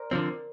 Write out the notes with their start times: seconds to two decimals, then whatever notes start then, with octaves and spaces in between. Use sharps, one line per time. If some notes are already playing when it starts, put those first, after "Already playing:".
Already playing: A#4 C5 D5
0.11 D3 F3 C4